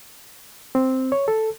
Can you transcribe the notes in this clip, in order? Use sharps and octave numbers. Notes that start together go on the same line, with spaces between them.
C4
C#5
A4